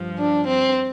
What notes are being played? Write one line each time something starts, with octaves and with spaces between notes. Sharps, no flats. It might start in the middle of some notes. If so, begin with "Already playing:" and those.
Already playing: G2 F3
D4
C4